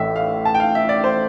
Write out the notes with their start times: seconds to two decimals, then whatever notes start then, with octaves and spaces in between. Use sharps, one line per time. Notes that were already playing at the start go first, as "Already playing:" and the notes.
Already playing: A1 A2 E5
0.16 F5
0.45 A5
0.55 G5
0.60 F5
0.75 E5
0.89 D5
1.04 C5